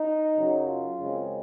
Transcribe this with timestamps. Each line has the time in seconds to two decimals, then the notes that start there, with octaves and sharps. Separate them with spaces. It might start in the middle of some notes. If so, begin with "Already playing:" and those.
Already playing: D#4
0.36 F#2 C#3 F#3
0.67 F4
0.99 F#2 C#3 G#3 C4